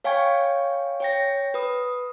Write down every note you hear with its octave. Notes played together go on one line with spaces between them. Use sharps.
C#5 F5 G5 G#5 C#6 G#6
C#5 G5 A#6
B4 D#6